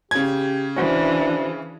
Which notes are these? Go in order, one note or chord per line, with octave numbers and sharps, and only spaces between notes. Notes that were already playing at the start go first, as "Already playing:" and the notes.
C#3 G4 G#6
E3 C#4 D4 F#4 C5